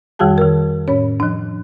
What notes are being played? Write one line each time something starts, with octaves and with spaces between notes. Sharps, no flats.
F2 D#3 G3 F#4 G#4 A5
D#3 A#4
A2 C#4 C#5
F3 D4